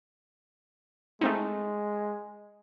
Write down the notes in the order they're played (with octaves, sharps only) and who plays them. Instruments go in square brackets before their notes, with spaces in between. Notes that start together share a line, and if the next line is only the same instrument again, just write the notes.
[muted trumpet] G#3 [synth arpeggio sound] A3 C4 D#4